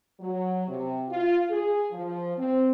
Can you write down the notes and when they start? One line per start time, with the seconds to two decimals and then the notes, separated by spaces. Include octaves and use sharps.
0.20 F#3
0.68 C3
1.09 F4
1.49 G#4
1.92 F3
2.37 C4